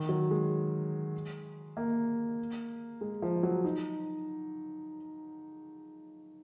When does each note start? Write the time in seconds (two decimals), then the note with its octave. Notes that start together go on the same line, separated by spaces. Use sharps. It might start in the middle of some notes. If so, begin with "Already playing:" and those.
Already playing: D#3
0.09 F#3
0.31 G#3
1.77 A#3
3.01 G#3
3.22 F3
3.43 F#3
3.64 D#4